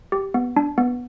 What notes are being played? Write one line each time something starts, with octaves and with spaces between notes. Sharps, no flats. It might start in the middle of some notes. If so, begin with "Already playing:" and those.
G4
B3
D4
B3